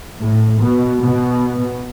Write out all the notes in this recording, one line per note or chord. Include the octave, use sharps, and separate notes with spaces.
A2
B2
B2